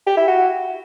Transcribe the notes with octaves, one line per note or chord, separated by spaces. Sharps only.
G4
E4
F#4